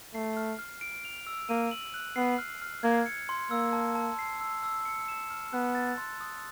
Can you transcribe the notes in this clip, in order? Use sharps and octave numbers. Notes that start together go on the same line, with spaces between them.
A3 C7
F6
F6
D7
F7
E6
A#3 D#7
F#7
F#6
B3 C7
F6
F6
A#3 G#6
C#7
C6
A#3 E6
A5
A5
C7
E6
E6
C#7
E7
F6
B3 F#6
A6
C6
D#6